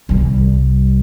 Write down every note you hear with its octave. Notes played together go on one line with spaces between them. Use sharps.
C2 G3